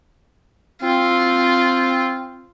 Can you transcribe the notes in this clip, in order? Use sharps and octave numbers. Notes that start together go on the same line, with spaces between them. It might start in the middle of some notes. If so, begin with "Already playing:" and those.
C4 F4